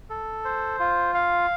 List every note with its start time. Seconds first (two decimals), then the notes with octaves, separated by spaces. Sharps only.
0.10 A4
0.45 C5
0.80 F4
1.14 F5